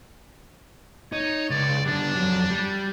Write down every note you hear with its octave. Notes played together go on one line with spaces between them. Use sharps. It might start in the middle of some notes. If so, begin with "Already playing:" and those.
D#4 C#5
C#2 D5
D3 G3 D4
F2 F#3
G3